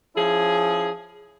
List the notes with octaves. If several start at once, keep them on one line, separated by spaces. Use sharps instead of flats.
F3 C#4 E4 G#4